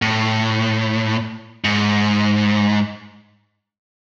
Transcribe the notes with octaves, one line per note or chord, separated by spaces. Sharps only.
A2
G#2